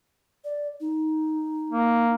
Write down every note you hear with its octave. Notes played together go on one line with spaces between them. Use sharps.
D5
D#4
A#3